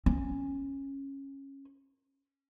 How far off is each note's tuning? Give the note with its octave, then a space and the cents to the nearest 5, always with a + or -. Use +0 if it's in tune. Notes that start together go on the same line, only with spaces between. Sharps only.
C#4 -15